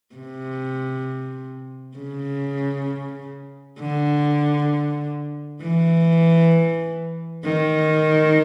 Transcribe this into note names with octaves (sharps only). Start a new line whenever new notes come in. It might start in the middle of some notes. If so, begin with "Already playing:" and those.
C3
C#3
D3
E3
D#3